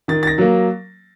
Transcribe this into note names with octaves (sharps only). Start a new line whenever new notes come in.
D#3 A6
A6
A#6
F#3 A#3